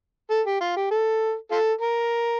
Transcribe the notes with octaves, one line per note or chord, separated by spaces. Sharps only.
A4
G4
F4
G4
A4
F4 A4
A#4